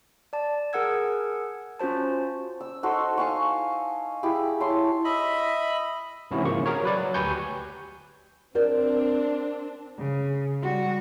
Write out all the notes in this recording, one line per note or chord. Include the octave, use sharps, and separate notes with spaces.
D5 A5
G#4 A#4 F#5 E6 G#6
C#4 F4 F#4 C5 A5
E6
D#4 F#4 A4 C5
F5 G#5 A5 C#6
E4 G4 G#4
E4 C#5 A5 C6
D#5 E5 B5
G#2 C3 E3 C#4 E4 F#4
C#3 F3 A#3 C#6
F#4 G#4 A#4 C#5
F#3 B4 D5
F#3
D2 G4 B4 G#5 C#6 G6
C4 D4 A#4 C5 D5
C#3
G3 F#4